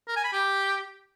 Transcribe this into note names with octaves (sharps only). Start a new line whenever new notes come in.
A#4
G#5
B5
G4